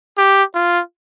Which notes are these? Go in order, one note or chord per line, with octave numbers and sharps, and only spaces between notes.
G4
F4